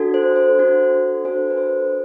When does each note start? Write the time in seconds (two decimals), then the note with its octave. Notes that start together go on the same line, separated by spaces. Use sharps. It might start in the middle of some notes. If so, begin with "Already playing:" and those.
Already playing: D4 F#4 A4
0.14 C5
0.36 C5
0.59 D4 F#4 A4
1.25 D4 F#4 A4 C5
1.51 B4
1.57 C5